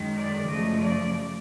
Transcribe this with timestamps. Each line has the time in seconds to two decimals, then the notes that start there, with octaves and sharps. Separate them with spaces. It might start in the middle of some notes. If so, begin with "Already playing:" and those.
Already playing: F#2 D#3 G#3
0.16 D5
0.48 F#2 C#3 F3 A3 D#5
0.80 D5